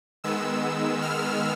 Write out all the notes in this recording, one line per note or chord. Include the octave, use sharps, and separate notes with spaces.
D#3 G#3 B3 E6
F6